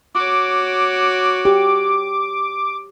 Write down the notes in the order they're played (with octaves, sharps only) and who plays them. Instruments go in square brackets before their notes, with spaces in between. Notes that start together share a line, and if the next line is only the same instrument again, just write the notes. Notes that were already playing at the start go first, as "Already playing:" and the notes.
[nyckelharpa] F#4 C#5 [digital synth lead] D6
[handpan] G4